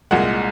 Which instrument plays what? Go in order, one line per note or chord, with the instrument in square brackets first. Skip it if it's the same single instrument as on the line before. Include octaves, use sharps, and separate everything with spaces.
[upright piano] C2 A#2 G#3 F#5